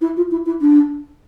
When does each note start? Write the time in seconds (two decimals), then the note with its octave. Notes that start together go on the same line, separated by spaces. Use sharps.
0.01 E4
0.16 F4
0.31 E4
0.45 E4
0.61 D4